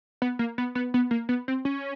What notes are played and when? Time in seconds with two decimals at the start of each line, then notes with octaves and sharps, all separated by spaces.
0.22 B3
0.39 A#3
0.58 B3
0.75 B3
0.94 B3
1.11 A#3
1.29 B3
1.48 C4
1.65 C#4